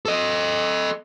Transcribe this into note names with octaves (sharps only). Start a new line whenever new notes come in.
A4 D#5